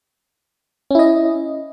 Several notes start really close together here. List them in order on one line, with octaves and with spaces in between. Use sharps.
C#4 E4 D#5